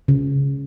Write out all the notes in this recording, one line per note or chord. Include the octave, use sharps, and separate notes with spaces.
C#3